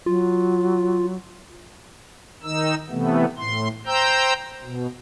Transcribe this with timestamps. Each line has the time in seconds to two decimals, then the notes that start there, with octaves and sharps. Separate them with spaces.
0.06 F#3 F4
2.43 D#3 D#4 E6
2.90 C3 E3 A3 B3
3.37 A2 C6
3.86 C5 G5 A#5 E6 G6
4.63 B2